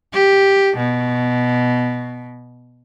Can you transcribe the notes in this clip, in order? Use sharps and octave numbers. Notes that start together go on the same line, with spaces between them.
G4
B2